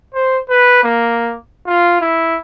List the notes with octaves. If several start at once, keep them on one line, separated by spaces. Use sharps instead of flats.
C5
B4
A#3
F4
E4